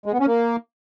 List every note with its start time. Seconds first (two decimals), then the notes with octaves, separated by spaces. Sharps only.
0.06 G#3
0.13 B3
0.20 C#4
0.27 A#3